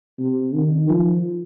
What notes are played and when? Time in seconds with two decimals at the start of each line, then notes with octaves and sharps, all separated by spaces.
0.19 C3
0.54 D#3
0.89 F3